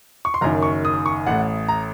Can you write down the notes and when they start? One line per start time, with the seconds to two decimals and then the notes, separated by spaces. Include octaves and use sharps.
0.25 C#6
0.34 C6
0.41 F#1 F#2 D#3 A#5
0.62 C#6
0.85 D#6
1.06 C#6
1.26 A1 A2 F#5
1.68 A#5